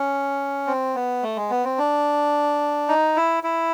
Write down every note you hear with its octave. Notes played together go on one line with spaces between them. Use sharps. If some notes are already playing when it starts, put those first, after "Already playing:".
Already playing: C#4
C4
B3
A3
G#3
B3
C4
D4
D#4
E4
E4